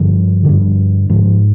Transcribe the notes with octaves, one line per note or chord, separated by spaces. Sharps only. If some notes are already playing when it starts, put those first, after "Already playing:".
Already playing: G2 D3 F3
G2 D3
G#2 F3